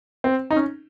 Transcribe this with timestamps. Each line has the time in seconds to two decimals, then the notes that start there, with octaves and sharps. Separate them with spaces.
0.24 C4
0.51 D#4
0.56 C#4